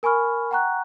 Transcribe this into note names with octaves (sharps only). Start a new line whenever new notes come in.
A#4 G#5 B5 C#6 F6
F#5 G5 A#5 C#6 F#6